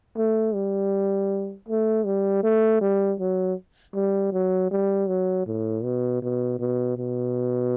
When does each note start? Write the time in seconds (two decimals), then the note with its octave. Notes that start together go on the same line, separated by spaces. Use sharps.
0.17 A3
0.54 G3
1.68 A3
2.05 G3
2.43 A3
2.81 G3
3.20 F#3
3.94 G3
4.32 F#3
4.71 G3
5.08 F#3
5.47 A2
5.84 B2
6.22 B2
6.60 B2
6.97 B2